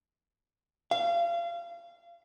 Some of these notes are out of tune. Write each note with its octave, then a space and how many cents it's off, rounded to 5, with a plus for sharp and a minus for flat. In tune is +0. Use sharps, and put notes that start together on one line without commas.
F5 -30